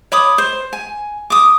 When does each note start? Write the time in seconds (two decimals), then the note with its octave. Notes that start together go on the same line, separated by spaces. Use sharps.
0.12 C#5 B5 D6 D#6
0.38 C5
0.73 G#5
1.30 D6 D#6